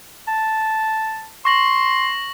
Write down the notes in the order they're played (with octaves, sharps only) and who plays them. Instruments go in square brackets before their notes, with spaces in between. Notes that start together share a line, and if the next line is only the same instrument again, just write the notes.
[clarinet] A5
[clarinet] C6 [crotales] C#6 A#6 F#7